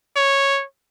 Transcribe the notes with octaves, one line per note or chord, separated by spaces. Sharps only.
C#5